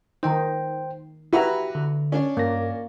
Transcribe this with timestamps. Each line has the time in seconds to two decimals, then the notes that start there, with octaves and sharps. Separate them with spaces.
0.23 D#3 D#4 C5 G5
1.33 E4 F#4 G4 B4 A#5
1.75 D3
2.12 C#4 D4 D5
2.37 G2 A#3 A#6